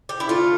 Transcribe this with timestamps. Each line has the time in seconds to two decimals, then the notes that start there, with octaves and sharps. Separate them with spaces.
0.09 G4
0.20 E4
0.29 D3 A3 F4